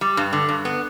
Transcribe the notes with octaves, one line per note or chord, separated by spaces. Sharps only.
G3
G2
D3
G2
B3